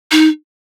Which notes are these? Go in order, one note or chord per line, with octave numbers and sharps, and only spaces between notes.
D#4